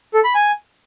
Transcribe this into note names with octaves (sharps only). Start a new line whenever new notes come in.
A4
B5
G#5